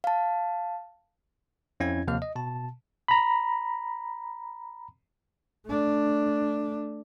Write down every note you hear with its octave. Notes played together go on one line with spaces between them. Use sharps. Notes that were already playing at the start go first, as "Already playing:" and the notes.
F5 A5
F2 C#4 E4 G#6
D#2 C3 F3 A#3 F5 F6
D#5
B2 A5
A#5 B5
A3 D4